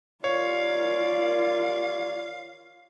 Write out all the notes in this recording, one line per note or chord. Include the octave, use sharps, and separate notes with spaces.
D#2 F4 A#4 C#5 D5 F5